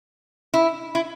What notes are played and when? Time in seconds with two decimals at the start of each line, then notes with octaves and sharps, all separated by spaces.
0.54 E4
0.95 E4